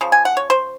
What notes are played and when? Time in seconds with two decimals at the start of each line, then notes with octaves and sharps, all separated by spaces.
0.01 C#3 F3
0.12 G#5
0.25 F#5
0.37 C#5
0.50 C5